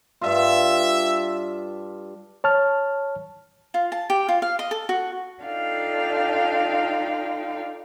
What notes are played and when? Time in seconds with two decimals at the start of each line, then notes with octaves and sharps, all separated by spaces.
0.21 G2 D4 F4 E5
2.44 C#5 A5 F6
3.74 F4
3.92 A5
4.10 G4
4.29 F4
4.42 F5
4.59 D#5
4.71 A4
4.89 F#4
5.43 D4 D#4 F4 A4 F5 G5